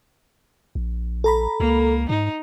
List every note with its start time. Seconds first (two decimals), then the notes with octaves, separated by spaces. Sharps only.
0.75 A#1
1.24 A4 A#5 B5
1.60 C#2 A#3
2.09 G#2 D#4